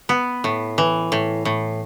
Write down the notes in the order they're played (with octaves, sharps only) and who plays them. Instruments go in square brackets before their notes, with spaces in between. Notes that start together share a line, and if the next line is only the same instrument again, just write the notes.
[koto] B3
A2
E3
A2
A2